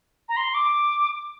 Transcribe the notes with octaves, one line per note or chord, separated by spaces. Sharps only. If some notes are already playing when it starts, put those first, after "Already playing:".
A#5
C6
D6